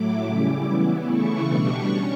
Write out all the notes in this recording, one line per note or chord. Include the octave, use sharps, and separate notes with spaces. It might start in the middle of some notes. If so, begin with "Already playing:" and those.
Already playing: A2 F#3 A3 E4 D6
C#3 G3 C#4 E4
E3 B3 E4
C#3 E3 A3 E4 C#6
B2 G3 D4 C#6
C#4